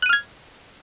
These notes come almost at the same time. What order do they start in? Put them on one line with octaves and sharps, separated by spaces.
F#6 D#7 F6 G#6